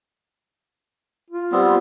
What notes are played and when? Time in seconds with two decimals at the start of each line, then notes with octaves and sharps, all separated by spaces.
1.31 F4
1.52 G3 B3 C4